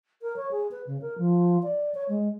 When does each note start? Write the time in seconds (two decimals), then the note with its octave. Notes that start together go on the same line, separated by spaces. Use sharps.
0.22 A#4
0.36 C#5
0.51 G#4
0.71 B4
0.87 C#3
1.02 A#4
1.18 F3
1.63 D5
1.94 C#5
2.09 G#3